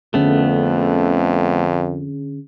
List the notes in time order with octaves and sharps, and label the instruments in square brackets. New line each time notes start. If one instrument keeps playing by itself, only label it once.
[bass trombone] F2 [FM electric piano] D3 C#4 G#4 [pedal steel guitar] A3 B3